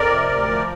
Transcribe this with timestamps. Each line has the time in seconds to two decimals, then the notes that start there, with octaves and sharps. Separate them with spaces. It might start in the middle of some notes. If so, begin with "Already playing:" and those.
Already playing: F2 A#4 D5
0.10 C3
0.29 D2
0.48 F3